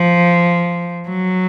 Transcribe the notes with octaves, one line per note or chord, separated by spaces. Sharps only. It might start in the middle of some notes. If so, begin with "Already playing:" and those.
Already playing: F3
F#3